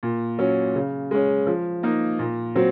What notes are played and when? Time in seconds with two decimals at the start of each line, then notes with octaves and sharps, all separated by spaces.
0.03 A#2
0.39 F#3 C#4
0.75 C#3
1.11 G#3 C#4
1.47 F3
1.83 A#3 D#4
2.19 A#2
2.56 F#3 C4